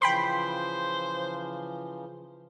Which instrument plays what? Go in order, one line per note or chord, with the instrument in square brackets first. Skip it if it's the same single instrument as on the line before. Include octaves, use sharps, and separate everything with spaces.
[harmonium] C#3 E3 F3 [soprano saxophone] C5 [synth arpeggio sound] G5 B5 C6